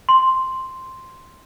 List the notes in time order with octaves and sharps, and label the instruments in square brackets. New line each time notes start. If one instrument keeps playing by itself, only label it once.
[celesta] C6